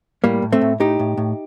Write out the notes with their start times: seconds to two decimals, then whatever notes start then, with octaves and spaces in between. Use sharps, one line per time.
0.24 A2 G3 A#3
0.42 A2
0.52 A3 C4
0.61 A2
0.80 A2 D#4 G4
0.99 A2
1.17 A2